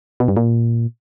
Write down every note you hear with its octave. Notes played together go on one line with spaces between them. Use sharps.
B2
G2
A#2